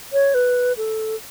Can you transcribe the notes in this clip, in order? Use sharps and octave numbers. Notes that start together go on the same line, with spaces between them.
C#5
B4
A4